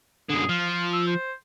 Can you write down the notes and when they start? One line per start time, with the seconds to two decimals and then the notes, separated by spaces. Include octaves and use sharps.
0.30 F#2 D3 G#4
0.49 F3 F4
0.93 E6
1.07 C5